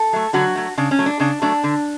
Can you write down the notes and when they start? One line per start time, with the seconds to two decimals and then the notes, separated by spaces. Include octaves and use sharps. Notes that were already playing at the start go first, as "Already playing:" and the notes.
Already playing: A4
0.13 F#3 A3
0.33 D3 F#3 F#4
0.55 F#3 A3
0.77 C#3 D4
0.91 C#4
0.99 F#3 A3
1.06 D4
1.20 C#3 D4
1.41 F#3 A3 D4
1.64 D3